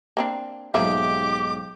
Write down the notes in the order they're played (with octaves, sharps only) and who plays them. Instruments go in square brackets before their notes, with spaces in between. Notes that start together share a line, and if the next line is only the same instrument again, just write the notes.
[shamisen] A#3 C4 D4
[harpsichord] B1 G#2 [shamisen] F3 A#3 E5 [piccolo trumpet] G4 [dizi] D6